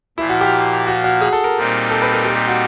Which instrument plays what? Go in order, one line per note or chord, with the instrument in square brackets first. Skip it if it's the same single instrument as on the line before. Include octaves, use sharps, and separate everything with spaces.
[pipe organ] A#2 F3 A#3 [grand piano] E4
[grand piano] F#4
G4
F#4
F#4
G#4
A4
A#4
[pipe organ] A#2 G3 C4 D#4
[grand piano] A4
B4
A#4
G4
G4
F#4